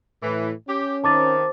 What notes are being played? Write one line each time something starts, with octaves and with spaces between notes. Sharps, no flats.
A2 E3
C#4 G4
C3 D#3 A5 D6 A6